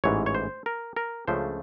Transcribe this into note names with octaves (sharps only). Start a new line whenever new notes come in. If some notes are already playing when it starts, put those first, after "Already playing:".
A1 G#2 E3 C#5
C#5
C5
A#4
A#4
C#2 C#3 F3 A3 D4 C5